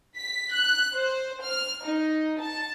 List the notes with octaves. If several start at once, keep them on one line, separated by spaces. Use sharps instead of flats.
B6
F#6
C5
F6
D#4
A5